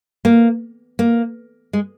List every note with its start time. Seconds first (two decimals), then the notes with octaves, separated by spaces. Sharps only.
0.25 A#3
0.99 A#3
1.73 G#3